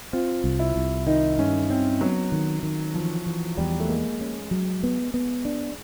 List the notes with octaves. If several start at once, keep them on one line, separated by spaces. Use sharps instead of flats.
C4 F4
C2
E4
C2
D#3 D#4
G2 C#4
C4 C#4
F#3 B3
D#3
D#3
E3 F3
E3
E2 G3
A3
G#3 A#3
C#4
F#3
B3
B3
D4